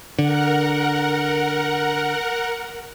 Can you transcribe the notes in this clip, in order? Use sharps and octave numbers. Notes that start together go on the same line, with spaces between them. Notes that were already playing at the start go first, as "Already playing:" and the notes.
D3 A#4 F#5